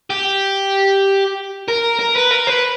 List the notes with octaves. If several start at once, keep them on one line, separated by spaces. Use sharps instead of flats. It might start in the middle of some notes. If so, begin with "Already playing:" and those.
G4
A#4
A#4
B4
A#4
B4